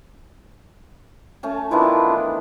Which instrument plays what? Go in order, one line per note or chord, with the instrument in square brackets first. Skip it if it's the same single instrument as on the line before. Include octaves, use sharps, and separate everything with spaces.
[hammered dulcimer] A3 C#4 A5
[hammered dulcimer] D#3 E3 B3 [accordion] D4 E4 F4